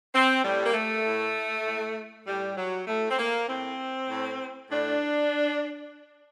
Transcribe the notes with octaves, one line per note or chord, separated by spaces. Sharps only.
C4
A2 G3
A#3
A3
A2
A2
A2 G3
F#3
A2 A3
C4
A#3
A2 C4
A2
A2 D4